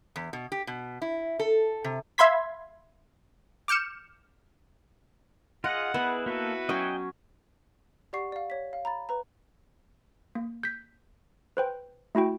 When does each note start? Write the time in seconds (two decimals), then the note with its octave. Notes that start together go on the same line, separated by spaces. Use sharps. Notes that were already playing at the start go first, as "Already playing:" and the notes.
0.16 E2
0.33 B2
0.52 G4
0.67 B2
1.02 E4
1.40 A4
1.84 C3
2.18 E5 F5 B5 C6 G#6 B6
3.68 D6 F6 G6 C#7 E7
5.64 F4 G#4 D#5 F#5
5.94 B3 E4 G#4 B4
6.26 A#3 E4 F#4 A4 B4
6.69 F#3 C#4 D#5 G5 G#5
8.13 G4 D5 F#5 C#6 C7
8.32 D5 F5
8.50 C#5 B6
8.73 F5
8.85 A#5 B5 A6
9.09 B4 A#5
10.35 A#3
10.63 G6 B6
11.57 B4 C5 G5
12.15 A3 E4 F#4 G5